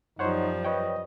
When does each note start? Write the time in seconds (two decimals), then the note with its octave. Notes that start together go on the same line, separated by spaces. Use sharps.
0.19 F#2 F3 G3 D#4 C5 C#5 F#5
0.65 B4 C#5 D#5 G5